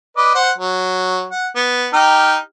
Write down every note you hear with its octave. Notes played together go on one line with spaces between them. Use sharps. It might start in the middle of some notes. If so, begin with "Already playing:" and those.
B4 D5 D#5
C5 F#5
F#3
F#5
B3
D#4 G4 F6